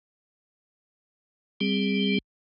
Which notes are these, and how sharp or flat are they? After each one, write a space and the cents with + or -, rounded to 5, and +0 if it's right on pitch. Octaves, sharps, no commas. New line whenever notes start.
G3 +0 C4 +0 G#4 -20